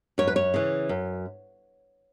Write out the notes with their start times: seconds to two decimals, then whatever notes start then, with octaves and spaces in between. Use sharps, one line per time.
0.18 F#2 C#5
0.27 B4
0.36 C#5
0.54 C#3 E3
0.89 F#2